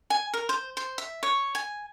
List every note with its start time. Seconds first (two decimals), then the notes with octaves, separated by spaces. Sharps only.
0.10 G#5
0.34 A#4
0.49 C5
0.77 C5
0.98 E5
1.23 C#5
1.55 G#5